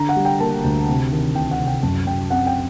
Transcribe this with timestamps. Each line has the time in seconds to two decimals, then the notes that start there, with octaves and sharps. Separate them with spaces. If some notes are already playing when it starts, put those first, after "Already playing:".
Already playing: D3 A#5
0.09 F#5
0.16 G3
0.25 G5
0.40 A#3 A5
0.64 D2
0.88 C3
1.12 D#3
1.35 C2 G5
1.51 F#5
1.59 C2
1.67 G5
1.83 F#2 A5
2.07 F#3 G5
2.30 C4 F#5
2.46 G5